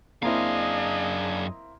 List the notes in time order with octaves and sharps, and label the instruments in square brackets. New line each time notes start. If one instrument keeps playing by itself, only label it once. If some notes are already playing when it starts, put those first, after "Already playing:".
[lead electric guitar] F#2 F5 [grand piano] A#3 C4 E4 [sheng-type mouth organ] D4 G#4 [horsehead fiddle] D#5